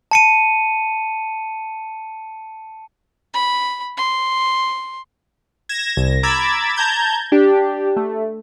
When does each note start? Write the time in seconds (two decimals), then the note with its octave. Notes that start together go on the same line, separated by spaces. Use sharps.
0.11 A5 C#7 D#7
3.34 B5
3.97 C6
5.69 G#6 A#6 E7
5.97 C2 A#6
6.23 A#5 B5 D6 E6 G#6 A6
6.76 A5 A#5 G6 G#6
7.32 D4 G4
7.96 A3